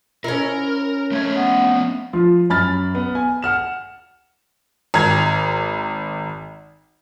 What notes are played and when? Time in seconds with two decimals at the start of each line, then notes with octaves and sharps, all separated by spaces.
0.24 C#4 E4 A#4
1.12 A3 C4 C#5 E5
1.36 B3
2.13 F3 F4
2.50 F#2 B5 F6 A6
2.95 B3
3.15 G#5
3.42 F#5 F6 E7
4.94 G#1 A#5 G#6